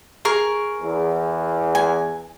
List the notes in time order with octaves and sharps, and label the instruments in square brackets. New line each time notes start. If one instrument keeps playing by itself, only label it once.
[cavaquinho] G#4 A#4 C#6
[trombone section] E2
[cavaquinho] G#5